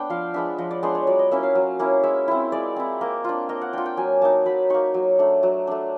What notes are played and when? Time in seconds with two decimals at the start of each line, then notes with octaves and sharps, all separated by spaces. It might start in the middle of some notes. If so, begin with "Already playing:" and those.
Already playing: B3 D4 D5 G5
0.10 F3 F5
0.34 G#3 B3 D4 E5
0.58 F3 D#5
0.71 D5
0.83 G#3 B3 D4 C5
0.95 C#5
1.07 F#3 D5
1.19 D#5
1.31 A#3 C#4 E4 E5
1.43 F5
1.55 F#3
1.79 A#3 C#4 E4
2.03 G#3 E5
2.28 C4 E4
2.52 G#3 D5
2.76 C4 E4
3.01 A#3 D#5
3.24 D4 F4
3.49 A#3 D#5
3.61 F#5
3.73 D4 F4 G5
3.86 G5
3.97 F#3 G#5
4.22 A#3 D#4 A5
4.46 F#3 B5
4.70 A#3 D#4 C#6
4.94 F#3
5.19 A3 D4
5.43 F#3
5.67 A3 D4